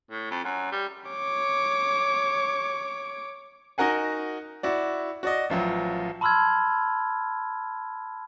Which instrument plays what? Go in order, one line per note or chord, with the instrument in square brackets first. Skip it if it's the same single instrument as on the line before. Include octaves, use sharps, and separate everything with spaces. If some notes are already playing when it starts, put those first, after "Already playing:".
[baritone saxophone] A2
F2
F#2
G3
[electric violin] C#5 D6
[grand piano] D#4 F#4 A#4 F#5 G#5
E4 F#4 D5
F#4 D5 D#5
A1 F3 F#3
[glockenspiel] A5 B5 C6 E6 F6 G#6